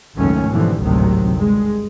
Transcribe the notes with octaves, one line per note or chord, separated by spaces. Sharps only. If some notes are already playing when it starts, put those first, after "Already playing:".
G#1 C#2 F#2 D#3 A3 C#4
G#2 B2 D3 E3 F3 G3
G#1 D2 A2 C3 D#3 F#3
G2 G#3